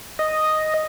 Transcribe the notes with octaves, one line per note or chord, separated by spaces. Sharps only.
D#5